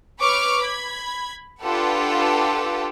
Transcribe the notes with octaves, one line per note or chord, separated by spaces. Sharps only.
B4 C#5 C#6 D6 F6
B5 G#6
D4 F4 G4 A4 B4 F#5